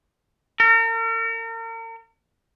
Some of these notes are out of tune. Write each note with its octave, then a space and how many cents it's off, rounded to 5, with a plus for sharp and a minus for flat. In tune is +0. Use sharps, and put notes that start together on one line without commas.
A#4 -40